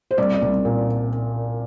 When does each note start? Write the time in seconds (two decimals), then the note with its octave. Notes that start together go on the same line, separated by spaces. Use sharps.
0.11 C5
0.18 C2 D5
0.34 D5
0.42 C2
0.65 A#2